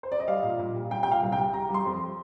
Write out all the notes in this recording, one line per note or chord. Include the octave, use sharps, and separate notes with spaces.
C5
D5
D#5
G3 F5
A#2
A#2
G3
G3 G5
G5
A#2
F5
C2
G5
G3
G3 A#5
G3 C6
F2